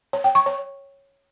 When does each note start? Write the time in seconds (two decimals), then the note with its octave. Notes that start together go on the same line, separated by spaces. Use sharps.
0.13 C#5
0.24 G5
0.35 C#6
0.46 C#5